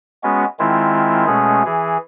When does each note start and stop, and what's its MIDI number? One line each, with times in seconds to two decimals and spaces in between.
0.24 0.45 56
0.24 0.45 59
0.24 0.45 61
0.24 0.45 66
0.59 1.26 51
0.59 1.26 56
0.59 1.26 60
0.59 1.26 64
0.59 1.26 65
1.27 1.63 47
1.27 1.63 56
1.27 1.63 57
1.27 1.63 61
1.27 1.63 68
1.65 1.98 52
1.65 1.98 68